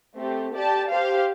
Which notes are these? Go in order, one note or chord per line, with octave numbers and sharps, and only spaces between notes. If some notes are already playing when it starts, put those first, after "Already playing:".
A3 C4 G4
G4 D5 A5
G4 C5 F5